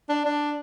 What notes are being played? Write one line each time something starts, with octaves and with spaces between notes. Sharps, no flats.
D4
D4